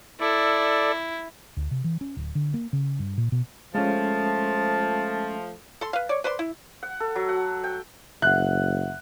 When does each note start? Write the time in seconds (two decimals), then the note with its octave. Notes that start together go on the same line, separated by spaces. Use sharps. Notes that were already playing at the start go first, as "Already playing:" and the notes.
0.20 E4 A4 D5
1.57 D2
1.71 C3
1.84 E3
2.01 C#4
2.17 D1
2.35 D3
2.54 A#3
2.73 C#3
2.99 G2
3.18 A#2
3.32 B2
3.75 F3 G#3 A3 C#4 A5
5.81 A4 C6
5.93 B4 F5
6.09 C#5 D5
6.24 B4 C5 D5 C6
6.39 E4
6.83 F#5
7.00 A4
7.15 F#3
7.29 F#5
7.64 G5
8.22 F#1 E5 F#5 F#6